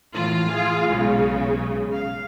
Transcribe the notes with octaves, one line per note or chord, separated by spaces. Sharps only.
A2 E3 F4
G#4 F5
B1 C#3 G#3
F5